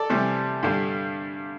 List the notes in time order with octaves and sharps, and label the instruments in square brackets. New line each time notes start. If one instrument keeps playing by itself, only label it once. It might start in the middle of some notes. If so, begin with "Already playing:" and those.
Already playing: [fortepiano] A4 D5
C3 E3 G3
G2 D3 G3